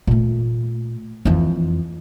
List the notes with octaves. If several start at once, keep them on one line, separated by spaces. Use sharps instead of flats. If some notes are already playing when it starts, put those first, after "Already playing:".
A#2 A3
F2 E3